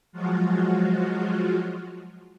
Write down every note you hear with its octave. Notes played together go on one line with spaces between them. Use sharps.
F3 F#3 G#3 F4 F#4